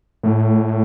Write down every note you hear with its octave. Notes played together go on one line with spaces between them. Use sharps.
A2